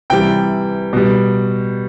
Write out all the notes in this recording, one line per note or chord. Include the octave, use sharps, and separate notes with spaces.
C3 E3 G3 G5
B2 G3